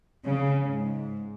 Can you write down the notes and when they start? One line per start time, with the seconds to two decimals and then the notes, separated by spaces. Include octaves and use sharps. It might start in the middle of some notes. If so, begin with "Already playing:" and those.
0.25 C#3
0.66 G#2